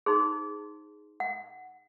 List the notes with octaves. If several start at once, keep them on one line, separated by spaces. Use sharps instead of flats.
D#4 G#4 C5 C6
F#5